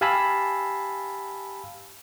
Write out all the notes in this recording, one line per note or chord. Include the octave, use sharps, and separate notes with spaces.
G4 F5 G#5 A5 B5 E6